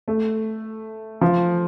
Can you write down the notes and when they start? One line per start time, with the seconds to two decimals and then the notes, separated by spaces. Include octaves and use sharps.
0.08 A3
1.21 F3